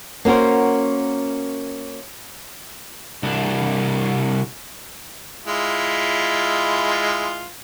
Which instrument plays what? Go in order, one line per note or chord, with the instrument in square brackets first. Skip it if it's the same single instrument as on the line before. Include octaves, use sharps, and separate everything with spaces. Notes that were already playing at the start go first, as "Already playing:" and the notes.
[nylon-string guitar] A#3 C#4 F#4 A#4 C5
[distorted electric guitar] C2 D4
[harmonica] G#3 E4 F4